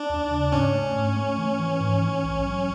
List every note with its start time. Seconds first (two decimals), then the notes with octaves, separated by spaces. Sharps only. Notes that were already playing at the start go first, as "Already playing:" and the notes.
Already playing: D4
0.10 D#2
0.31 C#3
0.52 G#2 C#4
0.74 A3
0.96 G#2
1.17 A3
1.38 E3
1.60 E3
1.81 G#2
2.02 E3
2.24 A#1
2.45 F#3